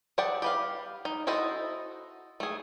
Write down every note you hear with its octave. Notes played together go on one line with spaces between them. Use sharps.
G#4 D5 E5 F#5 G5
G4 B4 F5
D#4
E4 F#4 A4 C5 D#5
A3 G#4